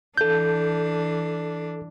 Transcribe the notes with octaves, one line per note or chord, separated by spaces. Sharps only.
E3 D4 A4 G6